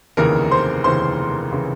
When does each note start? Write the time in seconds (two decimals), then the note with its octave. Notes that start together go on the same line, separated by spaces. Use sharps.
0.17 F1 D#2 C#3 E3 A#4 A#5
0.51 C5 C6
0.84 F1 D#2 C#3 E3 C5 C6
1.53 C#3 E3